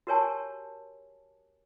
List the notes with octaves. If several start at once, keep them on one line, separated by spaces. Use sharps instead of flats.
F#4 G4 A#4 C#5 G#5 A5